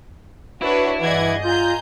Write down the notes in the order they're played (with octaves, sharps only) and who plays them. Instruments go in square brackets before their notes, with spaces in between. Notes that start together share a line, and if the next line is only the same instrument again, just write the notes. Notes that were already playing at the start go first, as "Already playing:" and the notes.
[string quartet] D4 [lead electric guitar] E4 [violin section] F#4 B4 C#5
[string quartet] G2 G#4 D#5 [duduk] E3 [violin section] D5 F#5 G#6
[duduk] F4 [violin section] G#5 A#5 G6